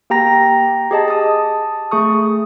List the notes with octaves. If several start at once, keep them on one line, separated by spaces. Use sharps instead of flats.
A#3 G4 G5 A#5 A#6
G4 G#4 D#5 A5
A5 D#6
A3 G#4 C#6 D#6